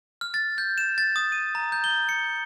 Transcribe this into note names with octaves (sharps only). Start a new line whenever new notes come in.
F6
A6
G6
E7
A6
D#6
D#7
A#5
G6
G7
C#7